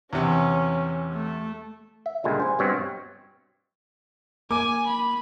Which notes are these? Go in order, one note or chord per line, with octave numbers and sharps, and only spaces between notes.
E2 C3 C#4
A3
E5
C#2 A#2 D3 G3 G#3
C5 G#5
G2 B2 C4 C#5
A#3 G#5 D6
B5